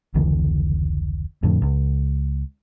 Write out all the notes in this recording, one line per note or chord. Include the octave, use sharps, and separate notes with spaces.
F1 C#2 D3 E3
F2 A2 D3
C#2